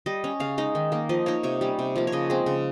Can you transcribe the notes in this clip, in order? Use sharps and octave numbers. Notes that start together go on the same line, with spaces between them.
G3 D#5
C#4
C#3 F5
G#3 D#4
D#3
A#3 D#4
F3 D#5
A#3 D#4 C#5
C3 C#5
G3 C#4
C3
F3 A#3
C#5
C#3 D#5
G#3 C4
C#3